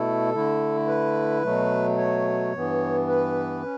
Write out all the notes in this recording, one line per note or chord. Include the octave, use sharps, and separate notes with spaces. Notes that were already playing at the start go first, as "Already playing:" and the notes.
Already playing: B2 A3 E4 A4
D3 A3 E4
B4
B2 F#3 A3
C#5
G2 E3 B3
B4
C#4